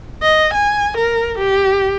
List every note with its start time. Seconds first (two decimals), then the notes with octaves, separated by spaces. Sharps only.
0.22 D#5
0.54 G#5
0.97 A#4
1.38 G4